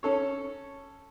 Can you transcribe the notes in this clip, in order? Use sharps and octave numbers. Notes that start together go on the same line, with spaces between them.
C#4 A4 C#5